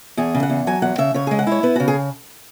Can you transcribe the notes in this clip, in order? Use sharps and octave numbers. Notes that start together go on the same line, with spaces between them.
E2 G#4
C#3
F#5
E2
F#3 G#5
E2 F#5
C#3 E5
C#3 C#5
G#3 G#4
F#5
E4 C#5
B3 B4
C#3 F#4
G#4